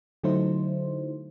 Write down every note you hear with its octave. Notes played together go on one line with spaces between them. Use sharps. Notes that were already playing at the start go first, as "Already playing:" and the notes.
D3 F#3 A3 D#4 E4 C5